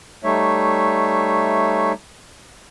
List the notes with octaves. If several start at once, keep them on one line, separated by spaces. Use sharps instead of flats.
G3 A3 D#4 C#5 E5